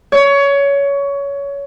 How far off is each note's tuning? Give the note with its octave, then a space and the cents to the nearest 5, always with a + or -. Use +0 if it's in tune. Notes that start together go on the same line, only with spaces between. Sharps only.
C#5 +20